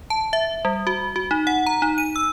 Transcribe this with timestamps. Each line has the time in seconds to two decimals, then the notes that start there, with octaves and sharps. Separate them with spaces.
0.10 A5
0.33 E5
0.65 G3
0.87 F#4
1.16 F#4
1.31 D#4
1.47 F#5
1.67 A#5
1.82 D#4
1.98 D#7
2.16 E6